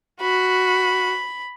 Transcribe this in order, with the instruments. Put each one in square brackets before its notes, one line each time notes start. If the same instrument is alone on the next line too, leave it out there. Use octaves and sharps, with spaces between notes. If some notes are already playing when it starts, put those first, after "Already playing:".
[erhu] F#4 [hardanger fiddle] B5